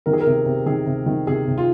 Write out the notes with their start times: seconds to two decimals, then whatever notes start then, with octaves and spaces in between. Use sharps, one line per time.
0.06 D#3 A#4
0.13 G#4
0.21 A#4
0.27 C3
0.46 C3
0.66 D#3 G#4
0.86 C3
1.06 D#3
1.27 C3 G#4
1.48 C3
1.58 F4